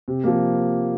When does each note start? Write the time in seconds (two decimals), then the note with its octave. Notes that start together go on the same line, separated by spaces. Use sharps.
0.08 C3
0.24 F3 A#3